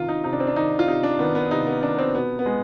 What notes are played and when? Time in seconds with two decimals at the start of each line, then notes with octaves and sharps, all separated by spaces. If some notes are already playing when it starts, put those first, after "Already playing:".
Already playing: C3 D#3 F4
0.09 D#4
0.24 C3 D#4
0.33 D4
0.40 C4
0.47 D4
0.56 D#3 D#4
0.79 F4
0.87 C3 D#4
1.03 D4
1.19 D#3 B3
1.35 B3
1.51 C3 D#4
1.67 B3
1.83 D#3 D4
1.95 B3
1.99 C4
2.14 B2 B3
2.39 B3
2.46 G#3